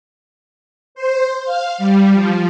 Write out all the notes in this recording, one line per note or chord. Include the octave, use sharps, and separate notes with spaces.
C5
F5
G3
F3